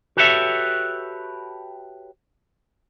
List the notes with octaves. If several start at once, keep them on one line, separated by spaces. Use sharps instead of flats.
F#4 G4 A4 B4 C#5 E5